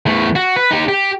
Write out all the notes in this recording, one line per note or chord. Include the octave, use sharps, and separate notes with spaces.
E2 A3
F#4
B4
D#4 G4
G4